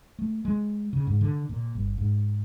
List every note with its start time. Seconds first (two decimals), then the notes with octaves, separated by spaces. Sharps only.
0.19 A3
0.45 G#3
0.93 C#3
1.07 G#2
1.21 D3
1.49 A#2
1.75 G1
1.98 G#2